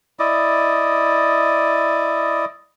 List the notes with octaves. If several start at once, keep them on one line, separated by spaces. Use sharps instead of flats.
E4 D5 D#5